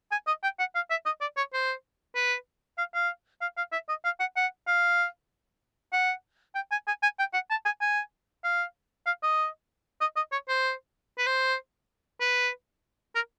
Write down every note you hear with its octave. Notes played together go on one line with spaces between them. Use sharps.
G#5
D#5
G5
F#5
F5
E5
D#5
D5
C#5
C5
B4
F5
F5
F5
F5
E5
D#5
F5
F#5
F#5
F5
F#5
G5
G#5
G#5
G#5
G5
F#5
A5
G#5
G#5
F5
F5
D#5
D#5
D#5
C#5
C5
B4
C5
B4
A#4